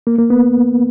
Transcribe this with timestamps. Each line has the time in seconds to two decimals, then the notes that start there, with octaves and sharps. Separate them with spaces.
0.07 A#3
0.18 A#3
0.30 B3